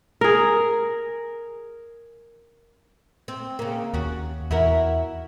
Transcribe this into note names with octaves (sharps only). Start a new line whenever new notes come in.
G#4 A#4
C4
C#3 A#3
D#2 C#4 F#4
E2 E4 F#4 A#4